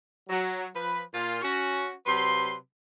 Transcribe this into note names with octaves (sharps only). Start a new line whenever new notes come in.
F#3
F3 B4
A#2 F4
C#4 F#4
C3 F#3 B4 C6